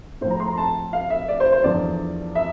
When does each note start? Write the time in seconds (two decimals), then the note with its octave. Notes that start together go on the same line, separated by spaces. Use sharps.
0.21 A2 F3 C5
0.31 A#5
0.40 C6
0.48 A#5
0.57 A5
0.93 F5
1.10 E5
1.28 D5
1.40 C5
1.52 C5
1.64 E2 D3 F3 D5
2.35 E5